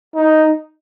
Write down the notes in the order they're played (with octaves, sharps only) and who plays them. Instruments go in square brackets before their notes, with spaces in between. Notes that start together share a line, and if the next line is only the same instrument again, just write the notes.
[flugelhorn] D#4